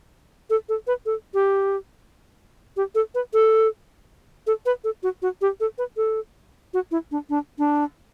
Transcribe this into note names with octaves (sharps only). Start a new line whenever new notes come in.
A4
A4
B4
A4
G4
G4
A4
B4
A4
A4
B4
A4
F#4
F#4
G4
A4
B4
A4
F#4
E4
D4
D4
D4